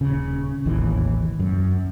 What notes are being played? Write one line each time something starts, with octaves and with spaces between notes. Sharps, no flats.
D#1 C#3
E1 A1 D#2 E3
F#2